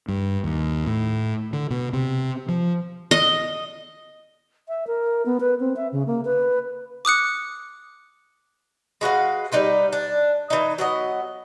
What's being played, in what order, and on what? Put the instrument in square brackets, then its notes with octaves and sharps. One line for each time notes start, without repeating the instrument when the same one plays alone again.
[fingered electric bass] G2
D#2
A2
D3
B2
C3
F3
[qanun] D#5
[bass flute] E5
A#4
B3
B4
C4
E5
C#3
A#3
B4
[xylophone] D6 D#6 F#6 C#7
[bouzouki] G#3 F#4 B4 F5
G3 D#4 B4 C5
D4
E3 D#4
F#3 B3 D#5